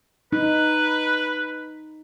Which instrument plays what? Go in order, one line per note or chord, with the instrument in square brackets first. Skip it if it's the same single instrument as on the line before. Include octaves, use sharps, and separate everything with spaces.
[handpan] D#4 [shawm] B4